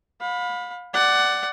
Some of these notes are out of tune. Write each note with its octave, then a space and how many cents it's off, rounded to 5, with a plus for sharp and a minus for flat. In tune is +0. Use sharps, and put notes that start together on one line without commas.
F5 +40 B5 +0
D5 +0 F#5 +20